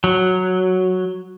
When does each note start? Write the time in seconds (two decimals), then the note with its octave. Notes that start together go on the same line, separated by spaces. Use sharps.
0.04 F#3